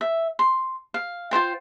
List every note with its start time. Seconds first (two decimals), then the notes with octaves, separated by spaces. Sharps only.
0.01 E5
0.39 C6
0.94 F5
1.31 F4 G4 C5 G5